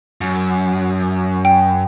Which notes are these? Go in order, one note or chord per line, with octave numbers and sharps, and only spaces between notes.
F#2
G5